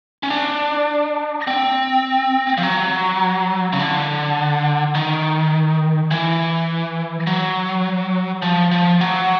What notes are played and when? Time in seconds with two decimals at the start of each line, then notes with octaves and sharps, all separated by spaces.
0.23 C#4
0.30 D4
1.47 C4
2.58 F3
2.63 F#3
3.73 C#3
3.79 D3
4.95 D#3
6.11 E3
7.27 F#3
8.42 F3
8.71 F3
9.01 F#3